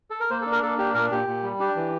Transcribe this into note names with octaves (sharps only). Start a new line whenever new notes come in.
A4
A#4
A#3 C5
A4
D4
A#4
A#3 A4
D4 G4
A#2 A#4
A#2 G4
A#2
G3
D4 G4
E3